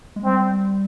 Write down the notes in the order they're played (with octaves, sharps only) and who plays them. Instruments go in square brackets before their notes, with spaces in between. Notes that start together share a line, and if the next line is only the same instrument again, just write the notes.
[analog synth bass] G#3
[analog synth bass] G3 [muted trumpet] C4